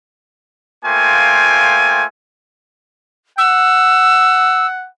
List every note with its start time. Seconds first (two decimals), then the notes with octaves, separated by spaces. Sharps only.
0.85 A3 A#3 F4 C5 G5 G#5
3.38 F#5 E6